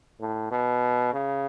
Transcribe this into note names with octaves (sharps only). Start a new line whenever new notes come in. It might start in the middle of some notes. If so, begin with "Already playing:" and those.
A2
B2
C#3